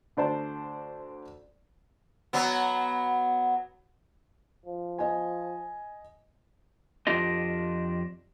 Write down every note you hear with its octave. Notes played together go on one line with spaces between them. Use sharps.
D2 D4 C5 D5 A5
F#3 B3
F3
D#5 G#5
F2 D4 F4 G4 D#5